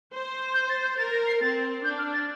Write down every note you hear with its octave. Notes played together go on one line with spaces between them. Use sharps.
C5
G6
A6
G6
A#4 A6
A#6
C7
C4 A6
D4 G6
F6
A6